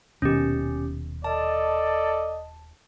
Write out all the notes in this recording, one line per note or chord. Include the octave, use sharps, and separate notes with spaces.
D#1 B2 D#3 C#4 G4
A4 D5 D#5 A5